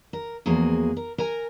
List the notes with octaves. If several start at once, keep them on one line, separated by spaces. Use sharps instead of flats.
A#4
E2 F3 A#3 F#4 G#4
A#4
A#4 G#5 A#5